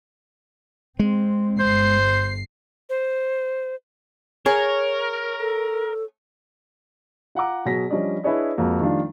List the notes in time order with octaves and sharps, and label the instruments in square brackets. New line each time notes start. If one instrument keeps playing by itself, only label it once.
[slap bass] G#3 [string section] C4
[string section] G1 C7 [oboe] C5
[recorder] C5
[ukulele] G#4 [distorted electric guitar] A#4 [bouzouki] C#5
[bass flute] A4
[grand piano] F4 F#5 A#5 D6
B2 F#3 G#4 A#6 B6
F3 G3 C#4 D4 D5 D#5
D4 E4 G#4 B4 C#5 D#5
F2 G#3 A#3 F#4
D#3 F3 G3 A3 D4 F4